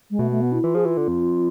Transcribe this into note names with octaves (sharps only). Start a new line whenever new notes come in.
G#3
B2 A3
A3
B3
E4
E3 F4
F3 G#4
E3 F4
D3
F2